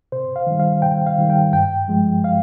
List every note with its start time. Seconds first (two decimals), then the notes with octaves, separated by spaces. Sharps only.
0.12 C3 C5
0.36 F5
0.47 D#3 G3
0.60 F5
0.82 C3 G5
1.06 F5
1.18 D#3 G3
1.30 G5
1.53 G2 G5
1.88 F3 G#3
2.24 F5